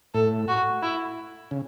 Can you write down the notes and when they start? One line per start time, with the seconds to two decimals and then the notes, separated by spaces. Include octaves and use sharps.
0.14 A2 A4
0.48 F#4
0.82 E4
1.51 C#3